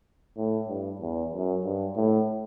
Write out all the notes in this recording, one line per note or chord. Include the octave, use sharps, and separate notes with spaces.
A2
G2
E2
F#2
G2
A2